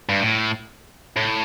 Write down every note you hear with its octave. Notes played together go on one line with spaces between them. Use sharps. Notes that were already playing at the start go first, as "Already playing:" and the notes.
G2
A2
A2